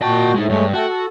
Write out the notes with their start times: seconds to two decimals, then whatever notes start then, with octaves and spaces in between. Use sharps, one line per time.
0.02 A#2 F#4 D#5 G5 A5
0.35 A2 G#3 D#4
0.49 G2 G#3 A3 C#5
0.74 A3 F#4 A4 G5
0.89 A4